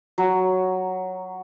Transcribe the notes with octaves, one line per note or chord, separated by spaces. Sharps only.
F#3